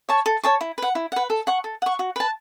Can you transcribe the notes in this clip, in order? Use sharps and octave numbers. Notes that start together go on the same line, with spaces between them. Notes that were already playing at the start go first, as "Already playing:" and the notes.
C#5 A5 C#6
A4
C#5 A5 C#6
E4
B4 F#5
E4
B4 F#5
A4
F#5 C#6
A4
F#5 C#6
F#4
B4 A5